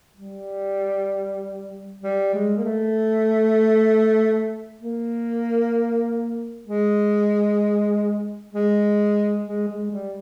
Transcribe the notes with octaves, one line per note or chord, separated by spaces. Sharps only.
G3
G3
G#3
A#3
A3
A#3
G#3
G#3
G#3
G#3
G3